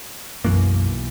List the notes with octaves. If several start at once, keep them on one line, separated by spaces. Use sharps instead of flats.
B1 F#2 E3 A#3